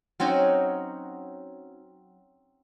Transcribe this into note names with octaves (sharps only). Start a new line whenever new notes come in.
F#3 C4 C#4 D#4